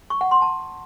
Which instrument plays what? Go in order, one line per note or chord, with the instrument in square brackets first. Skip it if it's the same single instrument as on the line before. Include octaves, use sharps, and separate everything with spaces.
[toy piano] C#6
F#5
C6
A5